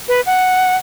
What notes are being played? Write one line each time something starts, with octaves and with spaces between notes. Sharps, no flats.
B4
F#5